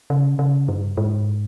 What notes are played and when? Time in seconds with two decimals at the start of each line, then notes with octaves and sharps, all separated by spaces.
0.10 C#3
0.39 C#3
0.68 G2
0.97 G#2